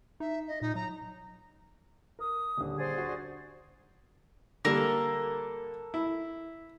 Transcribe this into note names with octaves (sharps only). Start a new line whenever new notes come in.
D#4 E5
D#5
A#2 D#4
F#3 A#5
A#4 D#6
D#1 D3
G#4 C5 D5
D4 F#4
D3 G3 A#3 A4 A#4
E4